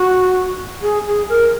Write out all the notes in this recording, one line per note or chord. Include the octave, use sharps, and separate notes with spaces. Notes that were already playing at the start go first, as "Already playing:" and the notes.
Already playing: F#4
G#4
G#4
A#4